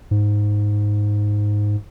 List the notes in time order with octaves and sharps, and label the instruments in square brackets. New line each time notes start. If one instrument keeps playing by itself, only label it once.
[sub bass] G#2